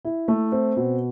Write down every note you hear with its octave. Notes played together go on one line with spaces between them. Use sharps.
E4
A3
C4
B2